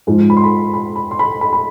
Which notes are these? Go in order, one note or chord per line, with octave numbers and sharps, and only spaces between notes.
G#2 F3 G#3
B5
C6
B5
B5
B5
C6
B5
B5
B5